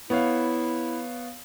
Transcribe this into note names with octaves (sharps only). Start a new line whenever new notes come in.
B3 E4 C#5 F5